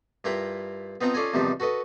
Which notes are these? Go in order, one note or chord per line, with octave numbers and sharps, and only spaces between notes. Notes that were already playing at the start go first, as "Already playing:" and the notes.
G2 E4 F4 A#4 G5 B5
B3 C4 D#4 F4 A5 A#5
C#4 F4 A4 D5 D#5 G#5
E2 C3 D#3 F3 G3 D4
F#4 A4 B4 D#5